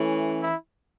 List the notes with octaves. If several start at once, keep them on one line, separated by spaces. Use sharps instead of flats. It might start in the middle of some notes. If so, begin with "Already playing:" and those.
Already playing: E3 A3 C#4
E4